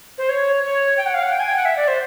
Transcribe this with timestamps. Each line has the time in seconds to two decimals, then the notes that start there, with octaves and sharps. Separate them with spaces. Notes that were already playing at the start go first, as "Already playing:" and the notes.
0.18 C5
0.29 C#5
0.64 C#5
0.98 G5
1.06 F#5
1.14 F5
1.23 F#5
1.32 G5
1.40 G#5
1.49 G5
1.56 F#5
1.65 E5
1.77 D5
1.88 C5